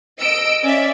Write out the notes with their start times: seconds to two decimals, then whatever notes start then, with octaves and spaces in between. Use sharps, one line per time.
0.20 D#5 E6 D7
0.63 C#4 D5 E5